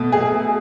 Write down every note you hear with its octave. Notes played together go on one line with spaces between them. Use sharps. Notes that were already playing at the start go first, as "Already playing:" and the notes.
Already playing: B2 A3
G#4